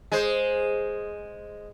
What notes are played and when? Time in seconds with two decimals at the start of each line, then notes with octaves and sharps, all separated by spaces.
0.12 G#3 C5